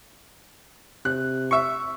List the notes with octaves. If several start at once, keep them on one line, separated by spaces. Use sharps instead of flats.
C3 F#6
E5 C#6